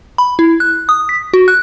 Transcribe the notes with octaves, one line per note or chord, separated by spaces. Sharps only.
B5
E4
F#6
D#6
B6
F#4
F#6